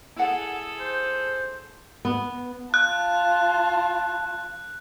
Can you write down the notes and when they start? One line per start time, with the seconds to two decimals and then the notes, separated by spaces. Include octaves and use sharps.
0.16 E4 G#4 A4 F#5
0.79 C5
2.05 B3
2.74 F4 A5 F#6